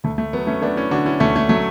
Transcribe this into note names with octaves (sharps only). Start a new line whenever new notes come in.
D2 A3
A3
F#3 B3
A3 C#4
A3 B3 D4
C#4 E4
D3 D4 F#4
C#4 E4
D2 A3 C#4
A3
F#3 A3